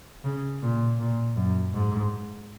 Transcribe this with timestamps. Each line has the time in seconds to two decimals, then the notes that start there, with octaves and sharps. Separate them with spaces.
0.24 C#3
0.62 A#2
0.99 A#2
1.36 F#2
1.73 G#2